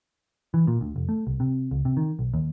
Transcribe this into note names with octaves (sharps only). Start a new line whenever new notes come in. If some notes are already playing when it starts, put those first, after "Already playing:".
E3
A#2
D2
F1
A3
C2
C3
C#2
C3
D#3
B1
D#2